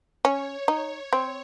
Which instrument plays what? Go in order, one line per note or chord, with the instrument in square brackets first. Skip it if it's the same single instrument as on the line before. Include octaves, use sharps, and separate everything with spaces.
[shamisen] C#4 [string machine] C#5
[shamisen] D#4
C4